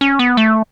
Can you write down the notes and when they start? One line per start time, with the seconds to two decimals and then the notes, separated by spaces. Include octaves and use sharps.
0.01 C#4
0.19 B3
0.37 A3